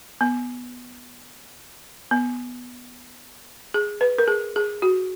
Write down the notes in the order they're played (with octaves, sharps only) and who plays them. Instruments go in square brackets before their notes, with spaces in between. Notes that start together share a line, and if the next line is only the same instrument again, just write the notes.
[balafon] B3
B3
G#4
B4
A#4
G#4
G#4
F#4